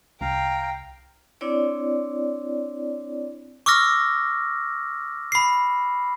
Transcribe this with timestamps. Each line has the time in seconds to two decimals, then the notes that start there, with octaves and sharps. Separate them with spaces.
0.21 C2 F5 G5 A#5
1.41 C4 D4 E4 C#5 D5
3.66 C#6 D6 E6 F6 A#6
5.32 B5 C7